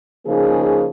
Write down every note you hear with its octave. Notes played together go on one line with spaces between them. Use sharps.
C#3 F3 A#3 D#4 G#4